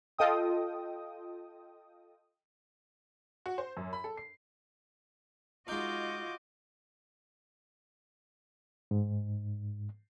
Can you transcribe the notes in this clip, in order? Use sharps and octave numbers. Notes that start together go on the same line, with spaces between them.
F4 A4 D#5 G5 D#6
F#4
C5
F#2
B5
A4
C7
G#3 D#4 F4 F#4 D#5 D6 G6
G#2